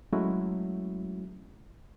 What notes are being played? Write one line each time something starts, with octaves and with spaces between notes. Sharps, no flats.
F#3 G#3 A3 C#4 E4 F#4